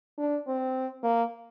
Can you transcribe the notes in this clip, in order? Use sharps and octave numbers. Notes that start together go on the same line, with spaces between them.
D4
C4
A#3